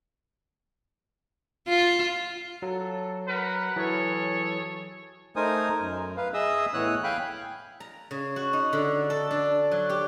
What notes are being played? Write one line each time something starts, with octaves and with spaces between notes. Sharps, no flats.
F4
F#3 A4
A#4 B4 F#5
E3 F#3 G#4 A4 C#5
A3 D#4 A#4 C5 G#5 D#6
F#2
B4 F5
G#4 D#5 E5 D#6 E6
A2 E3 B3 C#5 D#6 F#6
F5 G5 G#5 B5 F#6
A#5
C#3
F#4
D#4
D3
A4
D4
F#3
G4